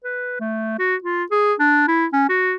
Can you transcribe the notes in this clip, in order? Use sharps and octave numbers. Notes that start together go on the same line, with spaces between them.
B4
A3
F#4
F4
G#4
D4
E4
C#4
F#4